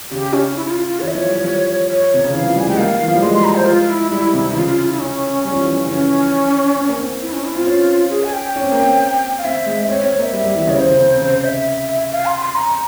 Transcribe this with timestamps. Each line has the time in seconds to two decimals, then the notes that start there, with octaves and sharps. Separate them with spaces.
0.11 C#3 G4
0.33 C#4
0.56 E4
0.66 E4
0.70 F4
0.86 F4
1.00 E3 C#5
1.08 E5
1.15 F3 C#5
1.30 G3
1.44 F3
1.89 C#5
2.14 C3
2.24 C#3
2.33 E3 F5
2.44 F3
2.56 G3 G#5
2.67 G#3 G5
2.78 A#3 F5
3.01 E3
3.08 F3
3.16 G3
3.22 G#3 C6
3.33 C6
3.44 A#5
3.56 C5
3.66 F4
3.89 E4
4.11 G3 E4
4.33 C3
4.50 E3 E4
4.55 C#3 F4
4.67 F4
4.78 F4
4.89 E4
5.00 C#4
5.44 G3 C#4
5.53 F3
5.62 E3
5.71 F3
5.85 C#3
5.89 E3 C#4
6.78 C4
6.88 A#3
7.00 C4
7.22 E4
7.33 C#4
7.44 E4
7.55 C4 F4
7.67 C#4
8.11 G#4
8.23 G#5
8.33 G5
8.56 C#4
8.64 C4
8.72 A#3
8.80 C4
9.38 F5
9.44 C4 E5
9.66 G#3
9.89 C4 C#5
10.00 C#5
10.03 C4
10.11 C#5
10.18 A#3 E5
10.33 G3
10.44 G3
10.56 E3
10.66 C#3 C#5
10.78 C#3 C5
10.90 C#3
11.00 C3
11.14 C3
11.22 C#3 C5
11.44 E5
12.11 F5
12.26 C6
12.41 C6
12.55 A#5